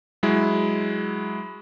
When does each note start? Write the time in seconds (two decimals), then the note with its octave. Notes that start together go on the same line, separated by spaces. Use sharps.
0.23 F#3 G#3 E4